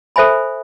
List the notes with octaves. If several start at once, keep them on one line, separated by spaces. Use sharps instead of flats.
A4 C5 E5 G#5 B5